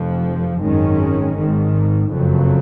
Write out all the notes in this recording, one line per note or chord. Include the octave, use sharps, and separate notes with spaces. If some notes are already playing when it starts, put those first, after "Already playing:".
Already playing: F1 F2 F3
G#1 F#2 D#3 G#3 C#4
G#1 G#2 D#3
F#1 F2 C#3 F#3